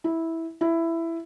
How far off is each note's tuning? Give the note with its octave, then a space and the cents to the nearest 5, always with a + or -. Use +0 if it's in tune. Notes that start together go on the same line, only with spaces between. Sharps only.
E4 -10
E4 +10